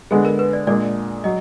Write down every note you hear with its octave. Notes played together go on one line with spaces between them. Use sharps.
D3 G#3 B3 G#4
A#4
B4
D5
A#2 G#3 D4 D5
F#3 D#5